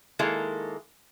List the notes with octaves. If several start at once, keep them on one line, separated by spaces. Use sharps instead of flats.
D#3 G#3 A#3 E4 A4